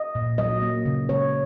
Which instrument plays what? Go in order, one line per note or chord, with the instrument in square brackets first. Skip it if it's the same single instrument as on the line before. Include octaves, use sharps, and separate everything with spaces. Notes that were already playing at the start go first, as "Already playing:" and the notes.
Already playing: [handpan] D#5
A#2
F#3 D#5
A#3
C#3
G#3 C#5